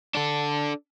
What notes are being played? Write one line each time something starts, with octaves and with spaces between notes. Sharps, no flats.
D4 A4